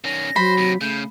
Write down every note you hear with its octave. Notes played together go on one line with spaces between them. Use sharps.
D#3 C#4 A#6
F#3 C5 B5
D#2 C3
C#3 A3 G6